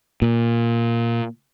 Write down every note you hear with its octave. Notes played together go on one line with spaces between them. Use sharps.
A#2